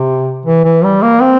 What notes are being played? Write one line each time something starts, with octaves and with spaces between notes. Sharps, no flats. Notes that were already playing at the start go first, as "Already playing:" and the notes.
Already playing: C3
E3
E3
G3
A#3
C4